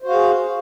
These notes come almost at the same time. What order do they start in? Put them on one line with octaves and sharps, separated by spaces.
C5 F#4 F5 G#4